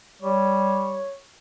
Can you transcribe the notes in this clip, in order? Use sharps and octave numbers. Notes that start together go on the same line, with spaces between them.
G3 C#5